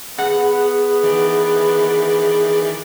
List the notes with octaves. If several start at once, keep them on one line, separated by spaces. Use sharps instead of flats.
B3 G#4 F#5
D#3 E3 D5